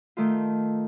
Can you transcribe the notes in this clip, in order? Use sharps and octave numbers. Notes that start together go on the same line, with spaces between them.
D#3 A3 F4